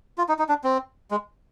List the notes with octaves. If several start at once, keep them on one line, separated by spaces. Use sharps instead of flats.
F4
D#4
D#4
D4
C4
G#3